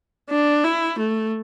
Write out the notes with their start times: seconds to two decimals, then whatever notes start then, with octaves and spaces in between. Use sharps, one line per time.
0.30 D4
0.64 E4
0.99 A3